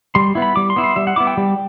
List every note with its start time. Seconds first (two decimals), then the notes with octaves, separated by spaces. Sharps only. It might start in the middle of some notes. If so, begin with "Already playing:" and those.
0.15 G3 C6
0.35 B3 E4
0.42 B5
0.56 G3 D6
0.70 C6
0.76 B3 E4
0.84 C6
0.96 G3 E5
1.07 F#5
1.16 B3 E4 D6
1.27 G5
1.37 G3